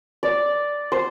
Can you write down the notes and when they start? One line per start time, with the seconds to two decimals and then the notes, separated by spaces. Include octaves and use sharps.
0.23 D5
0.92 C5